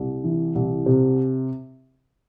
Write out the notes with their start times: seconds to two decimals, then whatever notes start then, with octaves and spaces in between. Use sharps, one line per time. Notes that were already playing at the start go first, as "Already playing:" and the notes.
Already playing: C2
0.24 E3
0.55 C2
0.86 C3